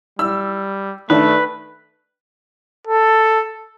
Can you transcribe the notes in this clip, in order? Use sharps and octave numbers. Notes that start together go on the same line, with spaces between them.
G3 E6
D#3 A3 D4 B4
A4